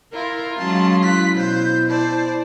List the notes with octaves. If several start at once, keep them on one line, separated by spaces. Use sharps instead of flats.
E4 F4 A#4 C6
F#3 G#3 C#4 A5
E4 F#6 B6
B2 C5 G6
C5 D5 A5